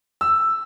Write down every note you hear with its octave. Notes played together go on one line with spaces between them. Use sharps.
E6